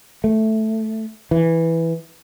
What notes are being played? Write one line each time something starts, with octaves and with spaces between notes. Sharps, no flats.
A3
E3